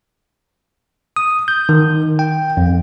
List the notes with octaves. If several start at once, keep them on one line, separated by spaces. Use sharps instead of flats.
D#6
G6
D#3
G5
F2